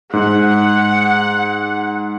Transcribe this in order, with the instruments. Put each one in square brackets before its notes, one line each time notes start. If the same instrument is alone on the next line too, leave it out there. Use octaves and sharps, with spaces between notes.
[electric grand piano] G#2 [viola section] F#5